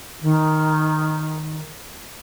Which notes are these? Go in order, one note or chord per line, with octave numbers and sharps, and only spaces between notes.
D#3